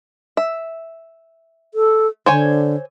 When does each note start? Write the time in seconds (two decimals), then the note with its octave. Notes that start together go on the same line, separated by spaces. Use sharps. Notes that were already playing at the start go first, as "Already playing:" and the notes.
0.37 E5
1.74 A4
2.26 D3 C5 C#5 G#5